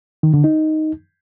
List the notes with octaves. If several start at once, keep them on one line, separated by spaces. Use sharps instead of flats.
D#3
D3
D#4